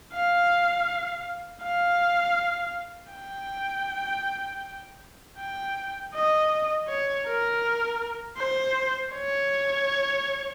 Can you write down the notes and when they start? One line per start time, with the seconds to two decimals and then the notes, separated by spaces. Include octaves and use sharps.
0.14 F5
1.63 F5
3.13 G5
5.38 G5
6.14 D#5
6.88 C#5
7.26 A#4
8.38 C5
9.13 C#5